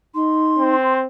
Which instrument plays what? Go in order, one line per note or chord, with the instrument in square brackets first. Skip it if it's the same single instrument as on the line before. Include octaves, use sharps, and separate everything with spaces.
[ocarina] D#4 [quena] C6
[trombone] C4